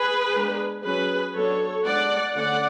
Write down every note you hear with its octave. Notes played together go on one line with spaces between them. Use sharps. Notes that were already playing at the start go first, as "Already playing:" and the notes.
Already playing: G#4 B4
G#3 B3 D4
F#3 C#4 G#4 B4
F#3 B3 D4 A4 C#5
G#3 B3 D4 D5 F#5
D3 A3 C#4 D5 F#5